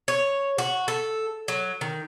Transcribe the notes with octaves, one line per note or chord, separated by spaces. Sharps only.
C#5
F#4
A4
F#3
D#3